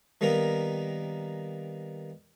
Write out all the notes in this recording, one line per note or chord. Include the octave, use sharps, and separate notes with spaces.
D#3 G3 A#3 B3 A#4